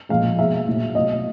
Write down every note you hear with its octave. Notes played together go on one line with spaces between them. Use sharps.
A#2 F3 G#3 F5
B2 G#3 E5
A#2 F#3
B2 F#3 D#5